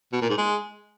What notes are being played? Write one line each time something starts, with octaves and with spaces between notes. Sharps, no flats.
B2
A#2
G#2
G#3